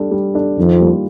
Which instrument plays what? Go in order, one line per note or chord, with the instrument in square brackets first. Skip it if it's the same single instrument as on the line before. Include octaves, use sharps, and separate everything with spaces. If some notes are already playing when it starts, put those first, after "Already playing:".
Already playing: [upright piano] G3 D4 A4
G3
D4 A4
[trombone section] F2 [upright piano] D#3
[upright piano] G3 A#3 F4